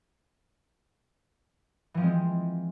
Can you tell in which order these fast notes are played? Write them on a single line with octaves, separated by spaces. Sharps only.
E3 F3 C4 G#3